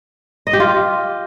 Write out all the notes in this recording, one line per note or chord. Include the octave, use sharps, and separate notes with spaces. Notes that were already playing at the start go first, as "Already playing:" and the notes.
D#5
G4
F4